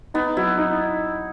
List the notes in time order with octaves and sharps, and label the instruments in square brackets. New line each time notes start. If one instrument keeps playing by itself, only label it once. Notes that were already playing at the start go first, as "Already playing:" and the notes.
[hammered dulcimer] B3 [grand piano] D#4
[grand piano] F#3 [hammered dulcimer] E4
[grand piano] D#4